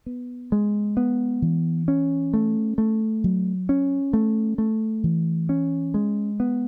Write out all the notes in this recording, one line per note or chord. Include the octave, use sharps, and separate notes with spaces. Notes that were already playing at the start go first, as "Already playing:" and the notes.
B3
G#3
B3
E3
C#4
A3
A3
F#3
C#4
A3
A3
E3
C#4
G#3
B3